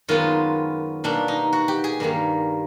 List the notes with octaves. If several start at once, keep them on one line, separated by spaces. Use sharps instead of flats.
F#2 D#3 G#3 B3 F4
B2 G3 A#3 D4
D#4
F#4
G4
G#4
G2 D#3 G3 A#3